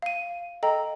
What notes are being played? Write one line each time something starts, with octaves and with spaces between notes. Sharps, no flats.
F5 D#7
A4 D#5 G5 A#5